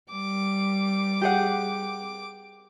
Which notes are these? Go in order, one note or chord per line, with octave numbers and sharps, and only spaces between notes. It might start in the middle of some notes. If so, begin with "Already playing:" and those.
G3 D6
G4 G#4 F#5